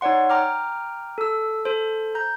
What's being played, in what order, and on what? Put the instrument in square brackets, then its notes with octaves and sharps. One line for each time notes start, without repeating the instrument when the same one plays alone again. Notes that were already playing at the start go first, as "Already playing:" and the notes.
[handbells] D#4 C#5 D5 F#5 C6
G5 A#5 D6 F6
A4 E6
A4 C5
A#5 G6